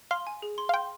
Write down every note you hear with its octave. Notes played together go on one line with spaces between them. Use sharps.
F5 C6
G#5
G#4
C6
F5
G5 C6